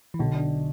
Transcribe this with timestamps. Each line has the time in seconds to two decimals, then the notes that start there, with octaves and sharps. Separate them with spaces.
0.14 E3
0.19 B1 D3
0.35 D4